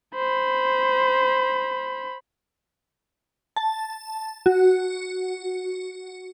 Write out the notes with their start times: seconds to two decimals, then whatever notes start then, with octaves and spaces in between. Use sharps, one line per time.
0.15 C5 B5
3.56 A5
4.46 F#4